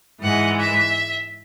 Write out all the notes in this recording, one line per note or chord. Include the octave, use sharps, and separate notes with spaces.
G#2 E3 G#3 F#5
E5